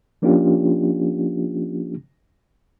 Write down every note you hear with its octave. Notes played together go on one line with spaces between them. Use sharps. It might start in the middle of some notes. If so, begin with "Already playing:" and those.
F3 A#3 C#4 D4 F4 G4